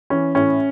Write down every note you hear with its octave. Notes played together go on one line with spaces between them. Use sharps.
E3 C#4
A2 C#4